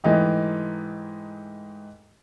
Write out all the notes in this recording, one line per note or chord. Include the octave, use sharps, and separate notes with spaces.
G#2 E3 A3 D#4 G4